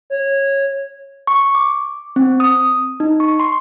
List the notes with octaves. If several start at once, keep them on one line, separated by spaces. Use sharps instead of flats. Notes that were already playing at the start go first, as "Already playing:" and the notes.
C#5
C#6
D6
C4
D#6
D#4
C#6
C6